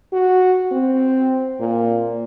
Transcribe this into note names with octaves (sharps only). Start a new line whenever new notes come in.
F#4
C4
A#2